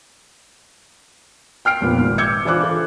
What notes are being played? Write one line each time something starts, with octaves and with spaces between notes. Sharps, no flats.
G5 F6 C7 D7
F1 A#2 B3
G#1
D6 E6 G6 G#6 C#7
E3 D4 F4 C5 D6 F#6
A4